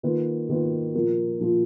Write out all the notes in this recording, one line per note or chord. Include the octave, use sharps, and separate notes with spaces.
D#3 A#3 F4 B4
D#3 A#3 F4 B4
A#2 F3 A#3 F4
A#2 F3 A#3 F4